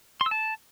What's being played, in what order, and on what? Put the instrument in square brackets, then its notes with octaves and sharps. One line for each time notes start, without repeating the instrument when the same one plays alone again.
[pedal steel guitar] C6
E6
A5